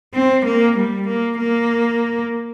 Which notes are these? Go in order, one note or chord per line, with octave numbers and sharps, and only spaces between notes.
C4
A#3
G3
A#3
A#3